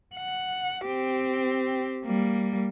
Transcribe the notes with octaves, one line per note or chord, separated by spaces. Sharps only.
F#5
C4 G4
G3 A#3